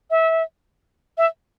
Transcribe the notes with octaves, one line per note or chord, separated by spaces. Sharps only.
E5
E5